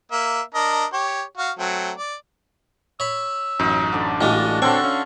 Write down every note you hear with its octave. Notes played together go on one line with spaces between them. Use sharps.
A#3 E5
D4 A#4 D#5
G4 C#5
F#4 F5
F#3 A3 C4
D5
C#5 B5 E6
A1 F#2 D#4
D3 D5
A1 G3 G#3 D4 F4 F#4 D#5
D3 C4 A4 C#5 G5 C6 C#6
C#4 F5